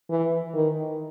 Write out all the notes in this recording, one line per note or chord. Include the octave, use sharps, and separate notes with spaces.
E3
D#3